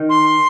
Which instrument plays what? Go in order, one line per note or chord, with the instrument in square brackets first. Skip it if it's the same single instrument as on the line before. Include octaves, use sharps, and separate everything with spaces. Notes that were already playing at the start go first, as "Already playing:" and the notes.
Already playing: [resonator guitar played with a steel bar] D#3
[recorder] C6